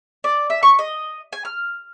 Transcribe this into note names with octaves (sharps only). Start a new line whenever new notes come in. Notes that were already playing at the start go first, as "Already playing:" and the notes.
D5
E5
C#6
D#5
G#5
F6